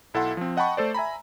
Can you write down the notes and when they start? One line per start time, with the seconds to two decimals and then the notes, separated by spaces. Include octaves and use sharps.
0.14 B1 E4 A4 E5 F#5 C6
0.37 F3 C4
0.57 D#5 F#5 G5 A5 B5 C#6
0.77 A3 A4 C5 D5
0.94 E5 G#5 A#5 B5